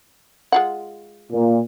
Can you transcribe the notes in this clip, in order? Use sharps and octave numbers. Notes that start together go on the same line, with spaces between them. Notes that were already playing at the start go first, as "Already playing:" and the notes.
G#3 F4 F#5
A#2